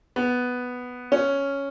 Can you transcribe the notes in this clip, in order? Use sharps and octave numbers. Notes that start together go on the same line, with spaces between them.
B3
C#4